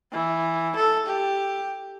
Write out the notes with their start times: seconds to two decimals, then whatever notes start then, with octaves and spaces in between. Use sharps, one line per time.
0.12 E3
0.76 A4
1.06 G4